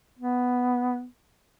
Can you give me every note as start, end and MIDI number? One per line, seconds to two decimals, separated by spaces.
0.19 1.05 59